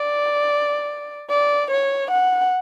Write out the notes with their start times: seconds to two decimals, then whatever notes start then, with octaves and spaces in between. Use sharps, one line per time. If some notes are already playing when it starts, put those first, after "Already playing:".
Already playing: D5
1.30 D5
1.71 C#5
2.11 F#5